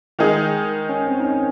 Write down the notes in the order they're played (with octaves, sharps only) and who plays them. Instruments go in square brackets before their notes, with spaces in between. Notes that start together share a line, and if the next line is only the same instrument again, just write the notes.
[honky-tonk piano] D#3 G#3 D#4 G#4
[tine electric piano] C#4
C4
D#4
C#4